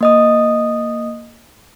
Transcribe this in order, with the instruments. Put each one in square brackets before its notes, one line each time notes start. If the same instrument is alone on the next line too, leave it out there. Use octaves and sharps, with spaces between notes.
[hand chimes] A#3 D#5 D#6